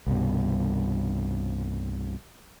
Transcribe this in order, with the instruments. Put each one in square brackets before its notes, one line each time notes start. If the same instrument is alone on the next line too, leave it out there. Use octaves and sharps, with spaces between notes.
[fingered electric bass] C2 G2 B2